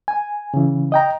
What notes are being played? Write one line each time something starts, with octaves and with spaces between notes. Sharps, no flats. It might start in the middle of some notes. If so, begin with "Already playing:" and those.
G#5
C#3 E3
D#5 G5 A#5